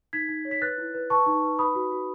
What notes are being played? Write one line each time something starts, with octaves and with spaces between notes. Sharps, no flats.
D#4 G#6 B6
D#4
C#5
B6
B4 F#6 A6
E4
B4
B4 A5 C#6
D#4
B4
B4 B5 D#6
F#4
F#4